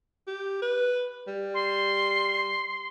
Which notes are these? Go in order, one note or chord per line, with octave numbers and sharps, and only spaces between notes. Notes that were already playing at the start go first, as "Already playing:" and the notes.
G4
B4
G3
C6